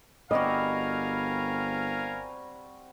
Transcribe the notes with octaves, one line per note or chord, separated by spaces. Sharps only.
G1 G3 C4 F#4 A#4 D#5 F5 G#5